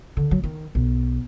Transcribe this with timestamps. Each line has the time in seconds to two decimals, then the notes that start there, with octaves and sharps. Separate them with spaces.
0.17 D3
0.31 F#3
0.44 D#3
0.75 B1